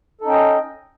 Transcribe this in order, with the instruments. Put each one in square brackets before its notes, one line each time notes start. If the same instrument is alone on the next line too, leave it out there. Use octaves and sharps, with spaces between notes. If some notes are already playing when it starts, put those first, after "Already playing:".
[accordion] A4
D#4
C#4
G5
D#5